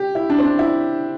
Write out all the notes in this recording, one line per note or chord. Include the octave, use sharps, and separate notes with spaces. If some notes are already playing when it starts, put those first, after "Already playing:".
Already playing: G4
E4
D4
C4
D4
E4